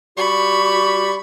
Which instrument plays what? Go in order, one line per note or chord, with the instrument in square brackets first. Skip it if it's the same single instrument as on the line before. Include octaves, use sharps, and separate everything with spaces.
[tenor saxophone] G3 [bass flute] F#4 [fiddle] B5 C#6